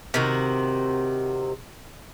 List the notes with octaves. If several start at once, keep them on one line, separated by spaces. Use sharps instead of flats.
C3 D#3 F#4